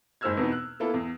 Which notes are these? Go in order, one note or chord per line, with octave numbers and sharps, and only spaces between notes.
F#1 G#2 C5 E6 F6 G#6
E2 B2 B3 C4 D#4
F#6
A#3 B3 E4 A4 A5
E2